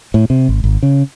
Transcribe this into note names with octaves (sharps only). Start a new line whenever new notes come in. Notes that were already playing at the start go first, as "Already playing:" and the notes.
A2
C3
G#1
G#1
C#3